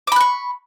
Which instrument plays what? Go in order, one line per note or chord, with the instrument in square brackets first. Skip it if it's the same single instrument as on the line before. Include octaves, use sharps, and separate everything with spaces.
[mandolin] D6
B5
F#6
C#6